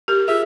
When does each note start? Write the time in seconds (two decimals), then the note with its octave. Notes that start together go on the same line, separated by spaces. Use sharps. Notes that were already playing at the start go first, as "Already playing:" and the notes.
0.08 G4 A#4
0.28 F4 G#4 E5